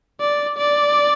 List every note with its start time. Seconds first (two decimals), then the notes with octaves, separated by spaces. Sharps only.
0.20 D5
0.58 D5